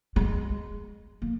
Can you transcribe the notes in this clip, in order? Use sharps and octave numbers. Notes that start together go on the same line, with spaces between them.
G#3
A#3